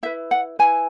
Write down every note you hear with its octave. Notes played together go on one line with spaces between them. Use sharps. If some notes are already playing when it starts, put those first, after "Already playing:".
E4 B4 E5
F#5
E4 B4 G#5